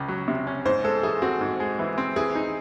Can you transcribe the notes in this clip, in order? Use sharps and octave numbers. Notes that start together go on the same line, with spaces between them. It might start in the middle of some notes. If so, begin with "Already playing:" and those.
Already playing: C#2 C#4
F#3
C3
C#4
G#2 C5
G#3 A4
E3 G#4
C4 F#4
G#2
G#3
E3
C4
E3 G#4
D#4